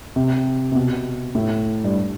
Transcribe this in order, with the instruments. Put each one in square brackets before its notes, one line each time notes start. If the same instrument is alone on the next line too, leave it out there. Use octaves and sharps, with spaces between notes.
[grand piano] C3
C3
B2
A2
G2